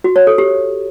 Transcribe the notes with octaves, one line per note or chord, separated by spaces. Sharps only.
F#4
C#5
A4
G4